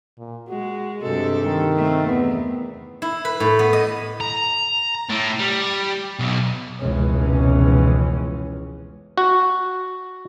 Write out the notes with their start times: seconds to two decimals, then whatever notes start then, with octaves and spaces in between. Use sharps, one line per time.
0.18 A#2
0.49 G#3 F#4
1.02 G2 C3 G#3 A4
1.44 D#3
1.77 A3 C4
2.08 E2 B3
3.02 E4
3.25 B4
3.40 A2
3.59 B3
3.73 D#5
4.20 A#5
5.10 A2
5.39 G3
6.19 B1
6.80 F1 C#2 B2 E3 G#3 C#4
9.18 F#4